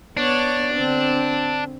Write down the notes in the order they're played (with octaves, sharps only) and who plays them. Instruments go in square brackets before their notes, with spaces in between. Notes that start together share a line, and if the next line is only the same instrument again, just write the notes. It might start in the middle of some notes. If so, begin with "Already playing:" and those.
[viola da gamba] B3 C#5 [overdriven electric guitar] D4
[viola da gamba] D3 C4